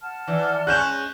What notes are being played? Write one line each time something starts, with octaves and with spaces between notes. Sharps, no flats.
F#5 A5 F6
E3 D5
G#3 C#4 F#6 G6 E7